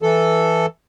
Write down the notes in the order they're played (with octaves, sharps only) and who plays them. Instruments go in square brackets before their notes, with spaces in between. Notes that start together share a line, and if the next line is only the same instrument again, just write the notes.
[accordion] E3 A4